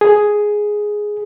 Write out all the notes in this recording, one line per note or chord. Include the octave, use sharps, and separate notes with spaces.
G#4